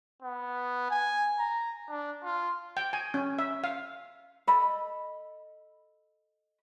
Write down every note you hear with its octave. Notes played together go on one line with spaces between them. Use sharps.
B3
G#5
A#5
D4
F4
G5
G#5
C#4
E5
F5
A4 D#5 B5